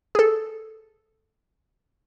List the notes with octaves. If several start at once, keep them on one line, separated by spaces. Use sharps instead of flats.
G#4 A4